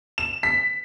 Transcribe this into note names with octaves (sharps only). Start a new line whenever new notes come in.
E7
B6